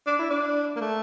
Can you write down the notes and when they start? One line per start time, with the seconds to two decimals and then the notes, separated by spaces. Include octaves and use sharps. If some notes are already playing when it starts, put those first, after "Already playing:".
0.07 D4
0.19 E4
0.31 D4
0.76 A#3
0.81 A3